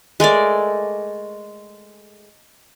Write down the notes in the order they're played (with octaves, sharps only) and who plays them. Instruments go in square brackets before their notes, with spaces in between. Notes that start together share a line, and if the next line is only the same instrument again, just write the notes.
[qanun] G#3 A3 A#4 D5